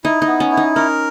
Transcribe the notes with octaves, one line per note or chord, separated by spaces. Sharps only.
D#4 E4
D#4
B3
C#4
E4
D#4
C#4 A#4